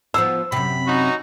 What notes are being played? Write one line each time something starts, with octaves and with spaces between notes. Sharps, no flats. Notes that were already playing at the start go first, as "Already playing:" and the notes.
F3 B3 C5 E6
F#2 C3 B5
C#4 D#4 F#4